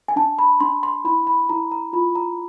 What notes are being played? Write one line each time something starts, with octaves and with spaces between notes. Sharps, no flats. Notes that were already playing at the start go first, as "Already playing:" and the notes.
G#5
D4 A5
B5
D4 C6
C6
E4 B5
B5
E4 A#5
A#5
F4 B5
A#5